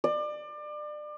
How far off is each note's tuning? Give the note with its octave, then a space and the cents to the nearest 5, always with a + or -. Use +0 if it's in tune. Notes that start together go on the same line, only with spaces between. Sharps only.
D5 +30